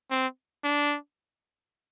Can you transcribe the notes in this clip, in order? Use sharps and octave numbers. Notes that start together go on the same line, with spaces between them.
C4
D4